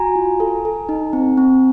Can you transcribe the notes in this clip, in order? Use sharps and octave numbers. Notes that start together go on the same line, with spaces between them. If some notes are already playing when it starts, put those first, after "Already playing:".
Already playing: F#4 G#5 A#5
F4
A4
A4
D#4
C4
C4